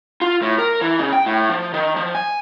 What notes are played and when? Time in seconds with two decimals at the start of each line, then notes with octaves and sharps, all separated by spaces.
0.21 F4
0.42 A2
0.58 A#4
0.81 E3
0.99 C#3
1.13 G5
1.26 A2
1.49 F3
1.74 D#3
1.96 F3
2.15 G#5